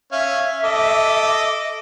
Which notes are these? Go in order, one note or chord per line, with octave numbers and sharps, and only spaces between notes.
C#4 E5 F5
A4 D#5 D6